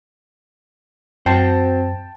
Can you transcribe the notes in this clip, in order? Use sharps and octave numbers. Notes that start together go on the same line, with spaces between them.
F#2 C4 F#4 C5 G5 A5